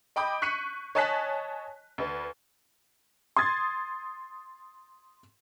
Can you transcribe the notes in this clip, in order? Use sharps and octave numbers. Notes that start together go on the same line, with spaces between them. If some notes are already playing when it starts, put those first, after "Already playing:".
D#5 G5 B5 D6 D#6 G6
C#6 F#6 B6 C#7 D#7
C#5 D#5 G#5 A5 F#6 B6
D2 B4
C6 D#6 G#6 A6